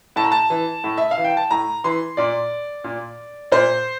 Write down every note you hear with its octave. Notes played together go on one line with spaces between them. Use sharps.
A2 A5
A#5
A5
E3
A2
E5
F5
E3
G5
A5
A2 A#5
E3 C6
A#2 D5
A#2
A#2 C5